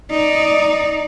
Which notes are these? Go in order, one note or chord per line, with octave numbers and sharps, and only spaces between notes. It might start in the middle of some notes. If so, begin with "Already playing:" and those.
D#4 D5